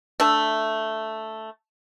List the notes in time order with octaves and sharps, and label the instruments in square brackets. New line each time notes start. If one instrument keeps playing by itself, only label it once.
[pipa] A3 D4 E5 A5